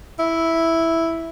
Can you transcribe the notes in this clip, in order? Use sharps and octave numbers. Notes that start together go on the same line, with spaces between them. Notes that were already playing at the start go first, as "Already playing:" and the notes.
E4